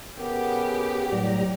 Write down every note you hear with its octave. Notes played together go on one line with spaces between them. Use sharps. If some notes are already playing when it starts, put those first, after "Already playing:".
C#3 B3 G4 A#4
A2 F#3 G3 A#5